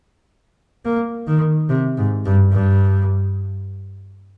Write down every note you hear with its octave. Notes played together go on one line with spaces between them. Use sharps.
A#3
D#3
C3
G#2
G2
G2